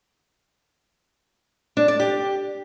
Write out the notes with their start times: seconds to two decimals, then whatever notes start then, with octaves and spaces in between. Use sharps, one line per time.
1.77 D4
1.88 D5
2.00 G4